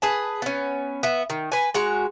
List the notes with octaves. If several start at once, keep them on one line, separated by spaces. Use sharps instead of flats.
G#4 B4 A5
B3 C#4
B3 E5
D#3
B4 G#5
G#3 F#4 A#5